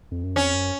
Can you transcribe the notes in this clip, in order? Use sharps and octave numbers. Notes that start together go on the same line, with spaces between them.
F2
F#2
F2 C#4
F#2